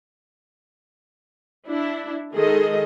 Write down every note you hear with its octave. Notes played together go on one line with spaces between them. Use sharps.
D4 E4
D#3 G#3 G#4 A4 D#5